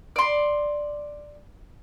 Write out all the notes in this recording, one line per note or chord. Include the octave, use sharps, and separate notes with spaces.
D5 C6